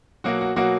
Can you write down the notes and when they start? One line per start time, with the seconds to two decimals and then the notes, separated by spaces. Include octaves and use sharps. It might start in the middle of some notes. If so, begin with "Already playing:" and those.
0.24 B2 F#3 A#3 F#4
0.41 F#4
0.56 B2 F#3 A#3 F#4